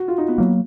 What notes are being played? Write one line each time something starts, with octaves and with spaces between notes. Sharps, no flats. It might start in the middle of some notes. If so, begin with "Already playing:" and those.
Already playing: F#4
F4
D#4
B3
F#3 A#3